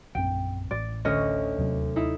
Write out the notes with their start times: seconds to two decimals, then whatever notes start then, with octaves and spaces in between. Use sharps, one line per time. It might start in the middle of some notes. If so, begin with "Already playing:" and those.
0.15 A#1 F#2 C4 G5
0.71 A1 D5
1.05 D2 C#4 C#5 D#5
1.58 D#2 C3 F#3
1.96 D#4 E4 E5